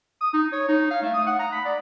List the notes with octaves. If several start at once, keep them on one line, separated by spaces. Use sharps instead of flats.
D#6
D#4
C#5
D#4
F5
A3
D#6
F#5
A#5
B5
D5